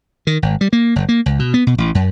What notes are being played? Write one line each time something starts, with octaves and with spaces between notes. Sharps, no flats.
D#3
G#1
G3
A#3
F#1
A#3
C#2
B2
B3
B2
A1
F#2